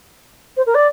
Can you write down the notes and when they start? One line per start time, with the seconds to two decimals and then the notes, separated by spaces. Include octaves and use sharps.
0.56 C5
0.66 A#4
0.74 D5